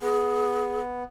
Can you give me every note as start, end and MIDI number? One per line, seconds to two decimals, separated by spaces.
0.01 1.03 59
0.01 0.79 68